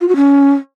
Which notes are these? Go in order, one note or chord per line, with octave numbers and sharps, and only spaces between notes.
F4
F#4
C#4